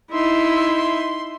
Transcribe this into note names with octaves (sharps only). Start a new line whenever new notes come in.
D#4 E4 E5 C6